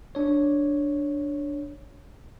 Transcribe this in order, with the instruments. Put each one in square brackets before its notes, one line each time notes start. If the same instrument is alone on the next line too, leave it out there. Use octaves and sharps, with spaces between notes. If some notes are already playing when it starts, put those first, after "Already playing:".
[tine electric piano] D4 C#5